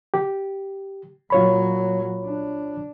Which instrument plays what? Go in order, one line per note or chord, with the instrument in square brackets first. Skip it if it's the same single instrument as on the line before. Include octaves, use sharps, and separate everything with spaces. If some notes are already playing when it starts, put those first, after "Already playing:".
[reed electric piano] G4
[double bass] A#2 F#3 [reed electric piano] F4 C#5 B5
[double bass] D4